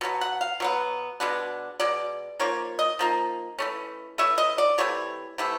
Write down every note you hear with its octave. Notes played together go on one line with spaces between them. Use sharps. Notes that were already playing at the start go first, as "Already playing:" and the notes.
B2 F#3 B3
F#5
F5
B2 F#3 B3
B2 G#3 B3 D4
B2 G#3 D5
F3 A#3 D#4 C#5
D#5
F3 A#3 D#4
E3 A3 C#4
E3 A3 C#4 E5
D#5
D5
C3 E3 A3 C#5
C3 E3 A3